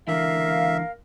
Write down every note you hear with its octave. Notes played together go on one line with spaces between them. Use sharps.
C#2 D3 E3 A#3 A#4 E5 F5